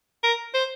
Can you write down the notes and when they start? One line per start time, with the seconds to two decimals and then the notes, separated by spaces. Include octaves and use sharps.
0.23 A#4
0.54 C5